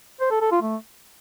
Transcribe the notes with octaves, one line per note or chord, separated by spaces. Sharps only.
C5
A4
A4
F4
A3